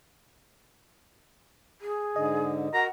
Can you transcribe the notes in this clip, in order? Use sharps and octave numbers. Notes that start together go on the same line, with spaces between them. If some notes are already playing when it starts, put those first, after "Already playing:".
G#4
G#2 D3 D#5
F#4 A#4 F#5 A#5